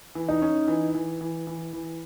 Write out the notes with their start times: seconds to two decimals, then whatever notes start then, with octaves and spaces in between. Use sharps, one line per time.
0.15 E3
0.29 D#4
0.42 C#4
0.68 E3
0.95 E3
1.21 E3
1.47 E3
1.73 E3